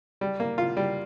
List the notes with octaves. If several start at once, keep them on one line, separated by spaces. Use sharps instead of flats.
G3
A#3
F4
G3